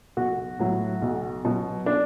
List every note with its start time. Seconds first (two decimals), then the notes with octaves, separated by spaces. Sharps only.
0.17 B1 F#4
0.59 A2 F#3
1.02 B1
1.45 B2 F#3
1.86 D4